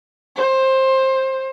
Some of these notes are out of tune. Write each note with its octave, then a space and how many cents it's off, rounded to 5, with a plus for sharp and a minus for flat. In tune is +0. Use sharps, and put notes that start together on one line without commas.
C5 +15